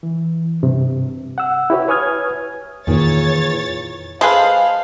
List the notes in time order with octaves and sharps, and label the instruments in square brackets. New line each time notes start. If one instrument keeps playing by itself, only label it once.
[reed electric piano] E3
G2 C3
F#5 E6
E4 F#4 G4 B4 C#5
B4 C#5 G#5 D#6 F6 G#6
[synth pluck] F2 [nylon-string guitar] A#2 E3 G#4 [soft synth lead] D#3 [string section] C#5 A6
[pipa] G#3 G#4 B4 [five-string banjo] A4 C5 [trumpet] F5